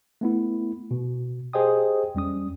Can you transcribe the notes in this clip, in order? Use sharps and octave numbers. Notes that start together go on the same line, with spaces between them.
A3 B3 E4
B2
G4 G#4 C5 D#5 G5 D#6
E2 G3 C#4 D#6